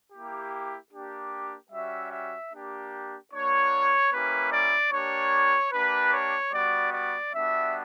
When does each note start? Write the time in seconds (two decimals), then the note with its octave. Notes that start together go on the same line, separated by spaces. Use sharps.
0.12 A#3 E4 G4
0.92 A#3 D4 G4
1.72 G3 C#4 F#4 E5
2.12 E5
2.53 A#3 D4 G4
3.32 A#3 D4 F#4 C#5
4.12 A#3 C#4 E4 G4 B4
4.52 D5
4.91 A#3 D4 G4 C#5
5.72 A#3 D4 G4 B4
6.12 C#5
6.52 G3 B3 F#4 D5
6.92 D5
7.32 G3 B3 D4 F#4 E5